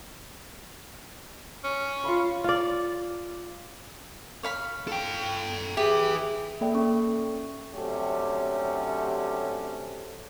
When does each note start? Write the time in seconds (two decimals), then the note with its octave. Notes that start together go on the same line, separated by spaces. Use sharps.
1.64 C#4
2.04 F4 F5 B5
2.44 F4 D5
4.43 C#5 F5 B5
4.88 A4 G5
5.77 G4 G#4 B4 E5
6.61 A#3 A4 D5 E5 G5
6.75 C#4 A4 C#6
7.74 C3 F#3 A3 C#4 D4 G4